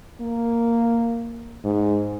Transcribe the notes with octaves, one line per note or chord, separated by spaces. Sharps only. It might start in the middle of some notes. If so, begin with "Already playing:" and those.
A#3
G#2